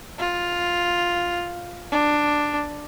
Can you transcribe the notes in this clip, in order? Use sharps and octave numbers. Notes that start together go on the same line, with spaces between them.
F4
D4